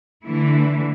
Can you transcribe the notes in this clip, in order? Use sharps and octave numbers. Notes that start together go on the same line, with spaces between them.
D3 E3 A3 E4